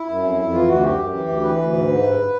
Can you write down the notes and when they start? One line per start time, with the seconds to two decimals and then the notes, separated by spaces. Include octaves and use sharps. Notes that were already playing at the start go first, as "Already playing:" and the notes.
Already playing: E4
0.09 F#2
0.23 F2
0.38 F2
0.53 E3 F4
0.68 D2 F#4
0.83 F#2 G4
0.98 F#2
1.13 E3
1.28 D2
1.43 E3 B4
1.58 D2
1.73 G#2
1.88 G#2
2.03 G2